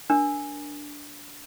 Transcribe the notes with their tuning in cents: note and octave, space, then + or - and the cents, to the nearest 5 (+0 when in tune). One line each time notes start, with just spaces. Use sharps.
D4 -5 A#4 +15